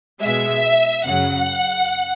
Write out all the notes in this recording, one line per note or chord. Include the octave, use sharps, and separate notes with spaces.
B2 G#3 E5
F#2 C#3 F#3 F#5